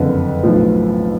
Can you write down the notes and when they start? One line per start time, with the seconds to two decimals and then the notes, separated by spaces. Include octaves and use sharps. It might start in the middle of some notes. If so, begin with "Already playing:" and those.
Already playing: F#1 F2 D3 B4
0.43 B1 A2 F3